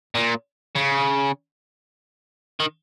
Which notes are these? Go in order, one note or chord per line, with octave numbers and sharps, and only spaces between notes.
A#2
C#3
D#3